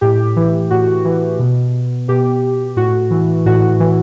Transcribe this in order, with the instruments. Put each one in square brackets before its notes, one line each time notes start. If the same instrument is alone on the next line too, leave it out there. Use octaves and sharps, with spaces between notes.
[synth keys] A2 G4
E3
A2 F#4
E3
B2
B2 G4
A2 F#4
E3
A2 F#4
E3